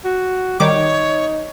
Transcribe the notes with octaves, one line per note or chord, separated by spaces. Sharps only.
F#4
D#3 G3 D#4 C#5 D6